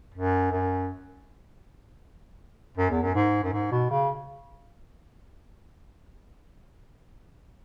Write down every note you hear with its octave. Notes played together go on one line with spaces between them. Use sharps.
F#2
F#2
F#2
E2
F#2
G#2
F#2
G#2
B2
C#3